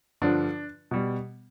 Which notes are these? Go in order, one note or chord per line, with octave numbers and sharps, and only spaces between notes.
G2 D3 F3 D4
B2 G3